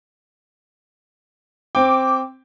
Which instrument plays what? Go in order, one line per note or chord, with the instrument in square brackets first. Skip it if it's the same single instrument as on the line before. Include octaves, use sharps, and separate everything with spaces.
[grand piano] C4 G5 [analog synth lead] D6